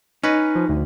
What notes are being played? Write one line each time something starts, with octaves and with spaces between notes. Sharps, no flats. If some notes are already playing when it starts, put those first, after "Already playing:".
C#4 D#4 B4
F3
D2